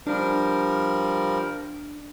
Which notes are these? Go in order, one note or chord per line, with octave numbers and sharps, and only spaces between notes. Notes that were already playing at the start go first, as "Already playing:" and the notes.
F3 G3 D4 A#4